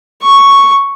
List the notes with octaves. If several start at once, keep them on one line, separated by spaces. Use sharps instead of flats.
C#6